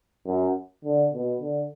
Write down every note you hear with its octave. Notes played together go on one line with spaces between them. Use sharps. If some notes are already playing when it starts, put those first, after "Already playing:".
F#2
D3
B2
D3